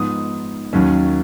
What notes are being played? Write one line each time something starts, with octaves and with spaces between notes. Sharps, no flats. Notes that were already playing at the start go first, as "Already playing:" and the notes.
Already playing: G#2 F3 B3 D#4 D#6
D#2 D#3 F#3 C#4